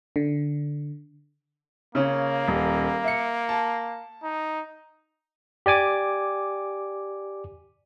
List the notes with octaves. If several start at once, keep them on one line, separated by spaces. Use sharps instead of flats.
D3
C#3 A#3 C#4
D#1
E5 C#7
A5
D#4
G4 D5 G#5 D6